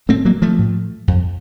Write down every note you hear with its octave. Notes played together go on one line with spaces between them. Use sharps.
A2 A3 C4
F#3 A#3
F3 A3
A2
F2